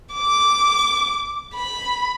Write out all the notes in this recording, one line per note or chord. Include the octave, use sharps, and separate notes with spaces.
D6
B5